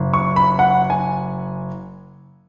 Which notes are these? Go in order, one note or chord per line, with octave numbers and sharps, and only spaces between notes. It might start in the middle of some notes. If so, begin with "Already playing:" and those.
Already playing: F#1
C#6
B5
F#5
G#5